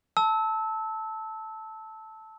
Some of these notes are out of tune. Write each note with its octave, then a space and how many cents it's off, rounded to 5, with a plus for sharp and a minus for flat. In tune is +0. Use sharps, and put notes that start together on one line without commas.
A5 +0 E6 -20